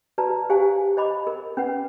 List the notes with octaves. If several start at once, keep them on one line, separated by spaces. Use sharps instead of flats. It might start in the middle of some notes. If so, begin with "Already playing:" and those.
F#4 B4 D5 A5 A#5
G4 C5 F5 G#5
C5 D#5 B5 D6
A#4
C#4 B4 F#5